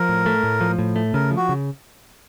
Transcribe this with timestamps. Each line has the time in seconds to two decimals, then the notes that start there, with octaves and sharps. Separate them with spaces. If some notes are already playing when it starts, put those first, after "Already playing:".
Already playing: F3 A#4
0.09 A2
0.26 A3
0.44 A2
0.61 F3
0.79 A2
0.96 A3
1.14 C#3 A#4
1.31 F3
1.37 F#4
1.49 C#3